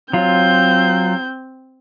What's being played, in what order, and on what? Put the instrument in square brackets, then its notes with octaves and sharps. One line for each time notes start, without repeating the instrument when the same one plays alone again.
[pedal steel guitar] F#3 F4 [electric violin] C4 G6